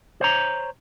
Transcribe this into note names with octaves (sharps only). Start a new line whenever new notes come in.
C5 C#5 A#5